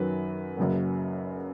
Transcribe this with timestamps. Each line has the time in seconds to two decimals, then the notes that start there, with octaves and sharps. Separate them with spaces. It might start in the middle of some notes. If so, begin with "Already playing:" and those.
Already playing: F#2 D#3 F#3 B4
0.57 F#1 F#2 C#3 F#3